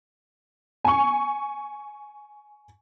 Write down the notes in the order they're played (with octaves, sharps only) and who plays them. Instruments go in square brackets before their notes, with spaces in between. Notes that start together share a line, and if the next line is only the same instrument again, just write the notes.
[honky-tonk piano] G#5 C#6